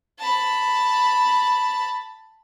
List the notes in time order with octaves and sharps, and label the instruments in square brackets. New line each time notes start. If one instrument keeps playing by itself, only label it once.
[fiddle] A5 B5